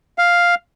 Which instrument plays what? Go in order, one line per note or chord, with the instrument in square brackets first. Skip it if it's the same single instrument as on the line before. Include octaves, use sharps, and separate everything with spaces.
[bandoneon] F5